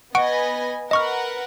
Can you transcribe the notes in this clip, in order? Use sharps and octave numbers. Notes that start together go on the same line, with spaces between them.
B3 D#5 F#5 G#5 C#6 D7
A#4 B4 D#5 F#5 C#6 F6